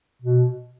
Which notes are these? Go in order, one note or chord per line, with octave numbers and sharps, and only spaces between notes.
B2